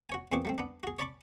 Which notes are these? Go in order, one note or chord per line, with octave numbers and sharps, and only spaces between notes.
F#4 C#5 G#5
E2 A#2 C4 G#4 C#6 D6
F#3 A3 C4
B3 D4
F#4 G#4
C#5 D5 A5 B5 C#6 D6